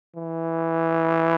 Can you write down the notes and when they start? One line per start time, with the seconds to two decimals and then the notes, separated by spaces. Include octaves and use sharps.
0.16 E3